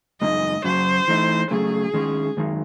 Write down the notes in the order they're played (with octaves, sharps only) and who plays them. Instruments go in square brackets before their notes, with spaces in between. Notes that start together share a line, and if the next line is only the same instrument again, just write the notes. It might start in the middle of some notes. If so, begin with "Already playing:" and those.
[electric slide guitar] F#2 C#3 G#3 D#4 [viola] D#5
[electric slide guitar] F#2 C#3 F#3 [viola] C5
[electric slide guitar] E3 A3 D#4
[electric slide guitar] C#3 F#3 A3 [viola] G#4
[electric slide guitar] D#3 G#3 C#4
F#2 D#3 G#3 D#4